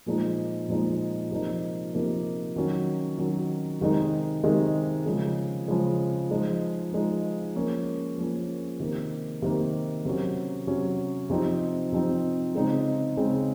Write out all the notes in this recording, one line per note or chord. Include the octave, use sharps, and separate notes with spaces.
A#2 F3 G#3 D#4
A#2 F3 G#3 D#4
C3 F3 A#3 D#4
C3 F3 A#3 D#4
D#3 F#3 C#4
D#3 F#3 C#4
C3 D#3 G#3 D#4
C3 D#3 G#3 D#4
C#3 F3 G#3
C#3 F3 G#3
F3 G#3 D#4
F3 G#3 D#4
F3 A#3 C#4
F3 A#3 C#4
C3 D#3 A#3
C3 D#3 A#3
C3 F#3 C#4
C3 F#3 C#4
C3 F3 C4 D#4
C3 F3 C4 D#4
C#3 G#3 C4 D#4
C#3 G#3 C4 D#4